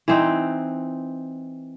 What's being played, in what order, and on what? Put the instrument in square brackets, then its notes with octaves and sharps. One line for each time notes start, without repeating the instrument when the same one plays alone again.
[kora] E3 C4 D#4